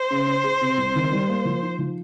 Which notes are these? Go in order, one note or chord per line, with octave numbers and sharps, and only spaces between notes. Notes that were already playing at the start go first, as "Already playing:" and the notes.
Already playing: C5
C#3
C#4
G#4
C3
C2
D#3
G3
A#3
F3
D#4
F3